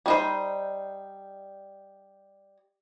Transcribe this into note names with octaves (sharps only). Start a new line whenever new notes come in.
G3 D#4 C5